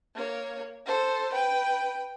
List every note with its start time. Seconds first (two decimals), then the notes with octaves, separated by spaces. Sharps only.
0.15 A#3 C#5
0.86 A4 C5
1.33 B4 G5